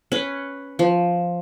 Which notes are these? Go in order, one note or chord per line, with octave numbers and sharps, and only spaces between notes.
C#4 B4
F3